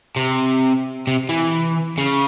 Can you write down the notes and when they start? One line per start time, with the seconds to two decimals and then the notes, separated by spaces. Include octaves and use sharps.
0.16 C3
1.07 C3
1.29 E3
1.98 C#3